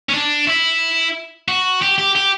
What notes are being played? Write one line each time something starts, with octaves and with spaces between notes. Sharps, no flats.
C#4
D4
E4
F#4
G4
G4
G4